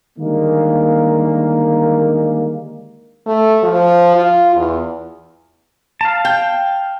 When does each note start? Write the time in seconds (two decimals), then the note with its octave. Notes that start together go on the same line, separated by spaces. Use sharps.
0.18 D3 D#3 G3 G#3 A#3
3.26 A3
3.63 F3
4.15 F4
4.55 E2
6.01 F5 A5
6.25 G5